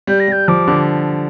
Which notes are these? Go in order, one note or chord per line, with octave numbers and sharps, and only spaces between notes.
G3 G6
A#6
G3 G6
F3 D6
D3